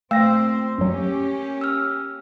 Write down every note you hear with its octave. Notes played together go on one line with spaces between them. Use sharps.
A#2 A3 C4 C5 F5 E6 A#6
F#2 F#3 A#3 C#4 G4
E6 F6